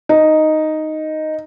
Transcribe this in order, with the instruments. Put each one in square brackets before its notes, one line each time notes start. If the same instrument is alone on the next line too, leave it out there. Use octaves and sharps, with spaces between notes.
[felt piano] D#4